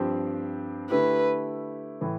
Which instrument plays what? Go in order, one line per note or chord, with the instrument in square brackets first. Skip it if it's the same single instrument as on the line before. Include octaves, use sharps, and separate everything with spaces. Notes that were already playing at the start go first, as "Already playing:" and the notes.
Already playing: [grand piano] G2 F3 C4 G4
[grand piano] D3 A3 E4 G4 [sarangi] B4
[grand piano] A2 E3